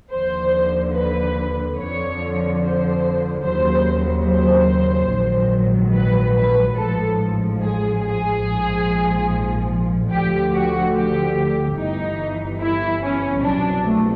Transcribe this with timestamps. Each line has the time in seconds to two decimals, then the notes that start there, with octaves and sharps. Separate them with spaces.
0.10 D#2 D3 F3 C5
0.93 B4
1.77 F2 D3 F3 C#5
2.60 C5
3.43 D#2 C#3 F#3 C5
4.26 C5
5.10 A#1 G#2 D#3 F#3
5.93 B4
6.35 B4
6.76 A1 G#2 F3 A4
7.60 G#4
8.02 G#4
8.43 A#1 G#2 F3
10.09 D2 D3 F3 G4
10.51 F#4
10.93 G4
11.75 G1 G2 E3 D#4
12.60 E4
13.01 C#4
13.42 C2 B2 F#3 D4
13.84 A3